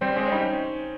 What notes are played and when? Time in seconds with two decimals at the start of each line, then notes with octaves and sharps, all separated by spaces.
0.01 G3 C4
0.16 G#3 C4
0.26 C#4
0.32 G3 D#4